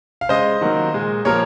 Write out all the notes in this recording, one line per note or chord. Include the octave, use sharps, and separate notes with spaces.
F5
C#3 G#3 C5 D#5
D#3 F#3 A#3
A#2 G#3
A#2 F3 A#3 A#4 C#5